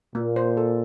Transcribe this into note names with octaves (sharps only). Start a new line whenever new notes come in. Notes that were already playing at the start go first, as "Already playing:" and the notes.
A#2 A#3
C5
A4